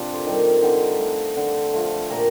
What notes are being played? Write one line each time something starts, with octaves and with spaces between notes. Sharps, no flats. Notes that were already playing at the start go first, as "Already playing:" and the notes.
Already playing: C3 D4 F4
A4 C5
D#3 G3
D3 D#4 G4
A3
D3
F3 A3
A#2 G4 A#4